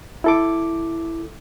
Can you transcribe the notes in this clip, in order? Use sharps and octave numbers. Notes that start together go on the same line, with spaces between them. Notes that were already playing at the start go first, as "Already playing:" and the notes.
E4 A4 D6